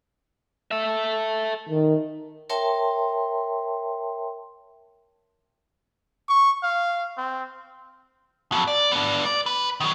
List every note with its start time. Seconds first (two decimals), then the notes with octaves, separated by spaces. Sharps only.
0.71 A4 E5
1.69 D#3
2.50 A#4 C#5 E5 G5 A5 C6
6.29 C#6
6.63 F5
7.18 C4
8.52 F2 F#3
8.67 D5
8.92 B3 D4
9.25 D5
9.46 B4
9.80 D#3 F#3